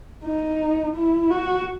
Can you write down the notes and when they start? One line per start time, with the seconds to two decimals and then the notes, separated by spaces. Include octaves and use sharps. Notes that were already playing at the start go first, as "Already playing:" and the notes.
0.25 D#4
0.96 E4
1.30 F#4